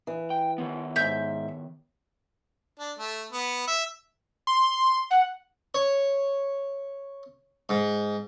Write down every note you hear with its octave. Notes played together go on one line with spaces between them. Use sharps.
E3
G5
D#3 B3
D#2 G#2 E5 G6
D4
A3
B3
E5
C6
F#5
C#5
G#2